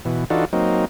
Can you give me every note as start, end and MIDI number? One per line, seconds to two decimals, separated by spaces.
0.05 0.25 47
0.05 0.25 52
0.30 0.45 52
0.30 0.45 62
0.30 0.45 63
0.30 0.45 65
0.30 0.45 66
0.30 0.45 69
0.53 0.85 54
0.53 0.85 58
0.53 0.85 60
0.53 0.85 63